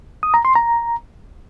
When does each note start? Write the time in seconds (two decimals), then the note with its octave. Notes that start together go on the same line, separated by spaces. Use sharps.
0.23 D#6
0.34 A#5
0.45 C6
0.55 A#5